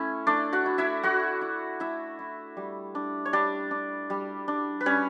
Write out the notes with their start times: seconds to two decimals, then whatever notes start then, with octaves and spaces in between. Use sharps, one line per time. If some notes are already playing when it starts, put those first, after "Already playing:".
Already playing: A3 C#4 E4
0.27 A3 D4 D5
0.53 F#4 F#5
0.66 E4
0.78 E4 E5
1.03 A3 F#4 F#5
1.41 E4
1.80 A3 E4 E5
2.19 E4
2.57 G3
2.95 D4
3.25 C#5
3.33 G3 D4 D5
3.71 D4
4.10 G3
4.48 D4
4.81 B4
4.86 G3 C#4 C#5